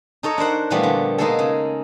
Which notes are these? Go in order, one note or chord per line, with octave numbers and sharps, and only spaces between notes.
D#4 A4 C#5 D#5
D4 A#4 C5 F#5
A#2 E3 F3 G3 A3 B3
D3
B2 G#3 A#3 D#4 G#4 A4
C#3